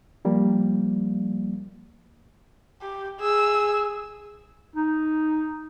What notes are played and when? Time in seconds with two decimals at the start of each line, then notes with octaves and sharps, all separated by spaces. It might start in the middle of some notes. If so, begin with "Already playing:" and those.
0.25 F3 G3 A#3
2.81 G4
3.20 G#4 E6
4.76 D#4